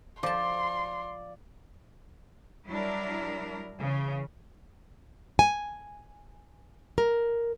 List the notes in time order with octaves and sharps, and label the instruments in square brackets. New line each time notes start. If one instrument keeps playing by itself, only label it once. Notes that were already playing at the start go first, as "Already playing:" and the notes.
[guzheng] F3 A5 [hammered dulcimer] D5 [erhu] C6
[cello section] F#3 G3 D4 E4 A#4
C#3 E3
[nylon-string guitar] G#5
A#4